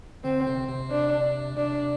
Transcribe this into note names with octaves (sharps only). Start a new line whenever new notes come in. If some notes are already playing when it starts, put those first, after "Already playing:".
D3 C4
C3
C3
D4
C3 D4